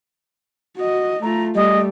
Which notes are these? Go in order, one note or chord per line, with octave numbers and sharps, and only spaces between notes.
F#4 D#5
A3 F4 A#5
G3 A3 D#5